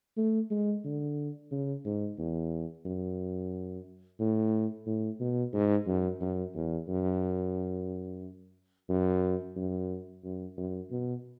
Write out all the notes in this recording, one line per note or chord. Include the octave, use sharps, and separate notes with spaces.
A3
G#3
D3
C#3
G#2
E2
F#2
A2
A2
B2
G#2
F#2
F#2
E2
F#2
F#2
F#2
F#2
F#2
B2